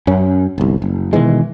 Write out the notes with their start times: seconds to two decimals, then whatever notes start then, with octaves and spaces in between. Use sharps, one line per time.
0.07 F#2 C#4
0.58 G1 C2
0.82 F#1
1.13 B2 D#3 E3 G#3